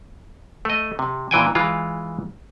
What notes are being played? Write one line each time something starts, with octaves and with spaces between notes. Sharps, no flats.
A3 D#5
C3
A#2 E3 G5 G#5
E3 G#3 F4